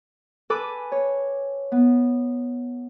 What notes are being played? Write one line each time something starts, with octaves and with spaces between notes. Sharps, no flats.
A4 B4 G#5 B5 D6
C#5
B3